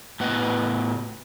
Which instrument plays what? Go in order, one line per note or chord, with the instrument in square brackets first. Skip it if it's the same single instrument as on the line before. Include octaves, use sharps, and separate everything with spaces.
[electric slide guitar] A2 B3 B4 D#5